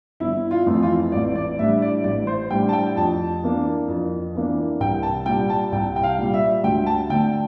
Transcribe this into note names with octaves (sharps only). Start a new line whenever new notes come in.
G1 E4
F4
F2 E3 A3 C4
F4
A1 D5
D5
A2 G3 D4 E5
D5
A1 D5
C5
A2 G3 D4 G5
A5
G5
F2 A5
E3 A#3 D4
F2
E3 A#3 D4
C2 G5
A5
A#2 G3 G5
A5
C2 G5
G5
F5
A#2 G3
E5
D2 G5
A5
D3 A3 G5